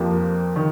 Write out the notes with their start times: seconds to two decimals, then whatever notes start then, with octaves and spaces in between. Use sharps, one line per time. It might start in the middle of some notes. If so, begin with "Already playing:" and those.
Already playing: F2 F3 A#3 G4
0.56 D#3